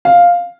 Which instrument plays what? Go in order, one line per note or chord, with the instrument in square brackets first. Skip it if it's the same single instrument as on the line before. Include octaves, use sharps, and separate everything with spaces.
[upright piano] F5